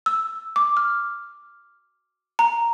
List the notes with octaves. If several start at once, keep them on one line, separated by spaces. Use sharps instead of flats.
E6
D6
F6
A#5